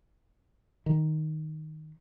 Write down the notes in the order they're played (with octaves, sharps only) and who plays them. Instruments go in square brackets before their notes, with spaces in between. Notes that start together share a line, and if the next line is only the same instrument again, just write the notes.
[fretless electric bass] D#3